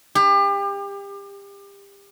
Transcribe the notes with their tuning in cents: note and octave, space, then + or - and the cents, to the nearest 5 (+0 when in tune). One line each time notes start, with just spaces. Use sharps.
G4 +30